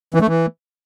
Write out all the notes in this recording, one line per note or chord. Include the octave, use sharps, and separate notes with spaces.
E3
A3
E3